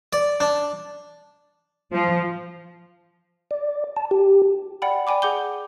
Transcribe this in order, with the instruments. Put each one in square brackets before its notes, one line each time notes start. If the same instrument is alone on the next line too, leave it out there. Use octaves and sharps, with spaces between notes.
[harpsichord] D5
D4
[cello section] F3
[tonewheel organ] D5
A5
G4
[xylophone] D5 F#5 G5 B5
D5 G5 G#5 B5 D6
G#4 F#5 D6 G6 G7